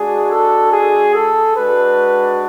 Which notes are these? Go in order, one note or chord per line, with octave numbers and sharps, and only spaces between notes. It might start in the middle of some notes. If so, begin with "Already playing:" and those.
Already playing: G#3 D4 F#4 G#4
A4
G#4
A4
G#3 D4 F#4 B4